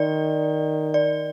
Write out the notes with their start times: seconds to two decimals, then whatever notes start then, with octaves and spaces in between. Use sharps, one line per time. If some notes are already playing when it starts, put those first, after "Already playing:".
Already playing: D#3 D5
0.94 D5